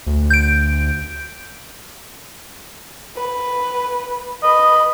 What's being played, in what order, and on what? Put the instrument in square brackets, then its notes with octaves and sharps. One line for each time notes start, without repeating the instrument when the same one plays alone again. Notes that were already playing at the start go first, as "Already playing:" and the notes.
[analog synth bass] D2
[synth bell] G6 D7
[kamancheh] B4
[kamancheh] B4 B5 [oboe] D#5